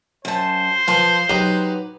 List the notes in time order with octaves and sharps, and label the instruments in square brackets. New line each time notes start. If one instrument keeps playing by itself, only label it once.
[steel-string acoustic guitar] F#2 A5 [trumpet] C5
[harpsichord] F3 C6 [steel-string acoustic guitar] B4 A5
[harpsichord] F#3 D#4 G4 [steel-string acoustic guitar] B4